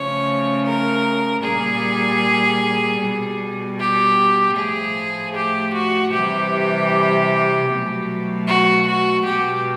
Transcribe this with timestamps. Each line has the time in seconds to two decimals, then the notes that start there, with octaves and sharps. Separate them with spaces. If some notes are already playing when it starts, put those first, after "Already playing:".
Already playing: C#3 F3 A3 C#5
0.65 A#4
1.43 A#2 G3 G#4
2.99 B2 G3
3.78 G4
4.55 A2 F3 A3 G#4
5.34 G4
5.72 F#4
6.12 C3 E3 G3 G4
7.69 B2 F#3 A3
8.46 F#4
8.86 F#4
9.24 B2 G#3 G4